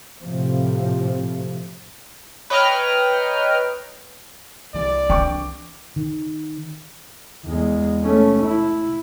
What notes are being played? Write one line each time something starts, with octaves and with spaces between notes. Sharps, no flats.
A2 C3 F3
B4 C#5 D#5 G5 A#5 F6
C2 E3 D5
D4 G5 C#6 D6
D#3
E2 G#3
A3 C#4
E4